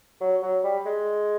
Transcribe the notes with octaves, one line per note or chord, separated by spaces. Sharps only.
F#3
F#3
G3
G#3